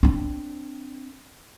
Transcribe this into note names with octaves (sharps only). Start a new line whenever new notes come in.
C4 D4